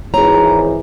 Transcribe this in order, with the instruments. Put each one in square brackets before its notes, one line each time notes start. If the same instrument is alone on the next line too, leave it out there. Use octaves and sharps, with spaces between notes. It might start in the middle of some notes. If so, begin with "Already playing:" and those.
[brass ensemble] G#1 E3 [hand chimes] G#4 C#5 [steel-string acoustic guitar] A#5